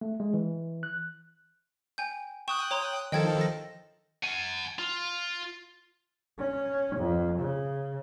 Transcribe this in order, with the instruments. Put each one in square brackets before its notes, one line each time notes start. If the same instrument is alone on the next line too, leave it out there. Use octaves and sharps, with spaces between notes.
[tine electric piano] A3
G#3
E3
F#6
[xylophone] G5 G#5 G6
[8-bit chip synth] G5 D#6 F#6 [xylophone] C#6 E7
[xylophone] C#5 A#5 C6
[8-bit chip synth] D#3 F3 A4 [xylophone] D#5 G5 G#6
[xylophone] A#6
[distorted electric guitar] F#5 G#5
F4
[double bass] C#4
F2
C#3